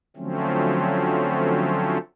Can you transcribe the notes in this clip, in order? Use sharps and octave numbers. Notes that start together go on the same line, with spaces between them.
D3 F3 F#3 A3 C4 C#4